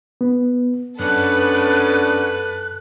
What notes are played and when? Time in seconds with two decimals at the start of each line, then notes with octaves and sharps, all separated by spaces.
0.21 B3
0.99 F#2 B3 C#4 D4 A4 B4 F#6